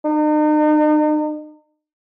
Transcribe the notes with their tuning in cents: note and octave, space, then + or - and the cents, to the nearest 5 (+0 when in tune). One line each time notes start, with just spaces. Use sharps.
D#4 -40